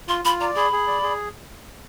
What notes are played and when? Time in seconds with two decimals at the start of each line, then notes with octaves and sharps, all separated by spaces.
0.08 F4 C6
0.25 F4 B5
0.40 D5 A#5
0.56 G#4 B5
0.72 G#4
0.87 D5
1.03 G#4